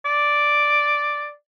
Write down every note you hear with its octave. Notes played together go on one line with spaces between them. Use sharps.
D5